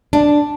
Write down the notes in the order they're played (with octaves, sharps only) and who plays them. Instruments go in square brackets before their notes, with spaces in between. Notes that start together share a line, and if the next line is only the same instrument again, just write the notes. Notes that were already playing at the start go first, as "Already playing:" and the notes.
[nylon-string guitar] D4